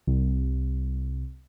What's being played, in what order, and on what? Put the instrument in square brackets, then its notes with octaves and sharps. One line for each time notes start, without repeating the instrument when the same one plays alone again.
[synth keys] C2